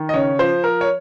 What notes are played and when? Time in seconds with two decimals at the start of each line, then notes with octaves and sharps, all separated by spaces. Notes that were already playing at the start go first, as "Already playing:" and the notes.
Already playing: D#3
0.09 D#5
0.14 C#3 C#5
0.39 F3 C5
0.64 F3 A#4
0.81 C#5